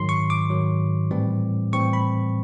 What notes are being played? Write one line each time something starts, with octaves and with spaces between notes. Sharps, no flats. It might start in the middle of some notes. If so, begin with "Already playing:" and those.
Already playing: G#2 D#3 F#3 C6
C#6
D6
G#2 D#3 F#3
A2 E3 G3 C4
A2 E3 G3 C4 C#6
B5